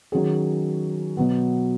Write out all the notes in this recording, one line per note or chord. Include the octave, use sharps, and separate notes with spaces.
D#3 F#3 C#4 G#4
B2 F#3 B3